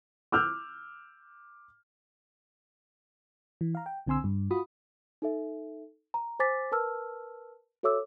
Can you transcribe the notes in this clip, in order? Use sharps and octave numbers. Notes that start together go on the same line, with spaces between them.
D6 E6 F6 G6
E3
F5 A#5
G5
B1 D3 C4 G#5 C6 E6
G2
F4 F#4 B5 D#6
D#4 A4 E5
A#5
C5 G#5 D6 A6 B6
A#4 B4 A5 E6 F6
F#4 A4 C#5 E5 D6 E6